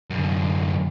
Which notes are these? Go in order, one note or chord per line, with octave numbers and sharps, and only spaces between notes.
F#2 D3